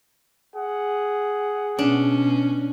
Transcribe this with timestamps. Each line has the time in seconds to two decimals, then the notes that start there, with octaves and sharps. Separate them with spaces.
0.55 G#4 F#5
1.79 B2 C#4 D4